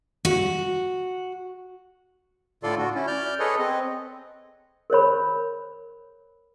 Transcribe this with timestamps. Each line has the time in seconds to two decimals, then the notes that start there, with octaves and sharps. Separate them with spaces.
0.25 F#4
2.63 A2 D3 F4 A4 D5 C6
2.78 F#4
2.94 C#4 E4
3.07 D5 F6 G6
3.39 G#4 A4 B4 C#5 D#5
3.59 C4 D#5
4.90 A#4 C5 C#5 B5